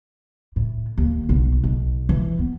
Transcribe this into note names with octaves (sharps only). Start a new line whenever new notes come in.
A2
D#2
B1
B1
E3
B3